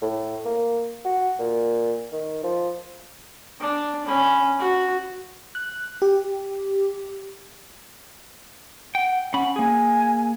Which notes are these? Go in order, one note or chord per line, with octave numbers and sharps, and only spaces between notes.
A2
A#3
F#4
A#2
D#3
F3
D4
C#4 B5
F#4
F#6
G4
F#5 G5
C#4 F#5 B5
A#3 G#4 G#5